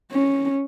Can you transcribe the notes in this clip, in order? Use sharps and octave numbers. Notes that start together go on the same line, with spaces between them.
C#4